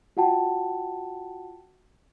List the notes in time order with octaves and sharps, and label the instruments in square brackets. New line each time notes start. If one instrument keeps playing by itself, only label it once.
[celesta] F4 F#4 F#5 G5 A5